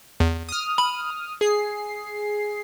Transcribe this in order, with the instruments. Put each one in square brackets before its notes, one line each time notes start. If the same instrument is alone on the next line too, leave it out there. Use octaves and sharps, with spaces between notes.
[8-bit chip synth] E2
[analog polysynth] D#6 F6
[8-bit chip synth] B5
[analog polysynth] G#4 C7